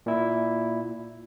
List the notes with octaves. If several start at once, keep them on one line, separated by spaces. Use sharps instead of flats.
A#2 E4